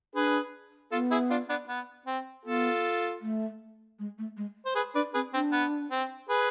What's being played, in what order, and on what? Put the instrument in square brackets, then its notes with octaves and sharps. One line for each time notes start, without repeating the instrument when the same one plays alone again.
[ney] D4 [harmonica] G#4 B4
[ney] B3 [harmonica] F4 A4
[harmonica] E4 G#4
D4 F4
B3 D4
B3
C4
[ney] B3 [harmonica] F4 A4
[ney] A3
G#3
A3
G#3
[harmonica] C5
G#4 B4
[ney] D4 [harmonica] B4 D5
[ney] C4 [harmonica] G#4 B4
[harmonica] C4 [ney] D4
[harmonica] B3
C4
G#4 B4